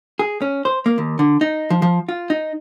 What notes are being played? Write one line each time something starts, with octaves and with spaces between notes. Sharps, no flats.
G#4
C#4
C5
A#3
D#2
D3
D#4
F3
F3
F4
D#4